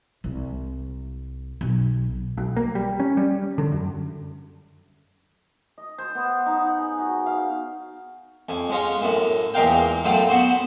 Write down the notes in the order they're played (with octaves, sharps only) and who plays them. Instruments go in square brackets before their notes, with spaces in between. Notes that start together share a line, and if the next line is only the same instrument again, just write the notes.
[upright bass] C2
B1
[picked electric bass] B1
A#3
G3
C#4
G3
D3
F#2
[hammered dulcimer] D#5
C5
B3
D#4
F#5
G#4
F#4
F5
[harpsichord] F2 G#5
G#3 C#4 F4
F#2 A2
E2 A#2 G#3 A#4 F5 G5
F#2 A2 F#3 F4 A4 G5
B3 F#4 C5